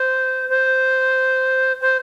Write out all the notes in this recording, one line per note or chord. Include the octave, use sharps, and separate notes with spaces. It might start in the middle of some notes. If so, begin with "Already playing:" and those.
Already playing: C5
C5
C5